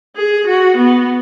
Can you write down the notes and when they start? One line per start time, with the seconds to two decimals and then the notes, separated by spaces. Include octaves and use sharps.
0.16 G#4
0.47 F#4
0.77 B3